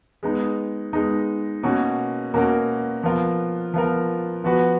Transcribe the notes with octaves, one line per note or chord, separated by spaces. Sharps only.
G#3 B3 D#4
G#3 B3 D#4
B2 A#3 C#4 F#4 A#4
B2 A#3 C#4 F#4 A#4
F3 B3 F4 A#4
F3 B3 F4 A#4
F3 B3 F#4 B4